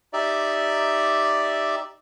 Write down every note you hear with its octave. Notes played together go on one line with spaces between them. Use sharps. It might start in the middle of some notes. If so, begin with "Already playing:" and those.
D#4 G4 D5 E5